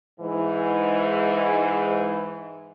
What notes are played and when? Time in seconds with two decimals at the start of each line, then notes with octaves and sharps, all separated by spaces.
0.20 G#2 E3